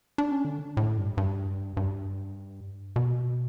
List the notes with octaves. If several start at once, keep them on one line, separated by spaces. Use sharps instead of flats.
D4
C#4
D3
A2
G2
G2
G2
B2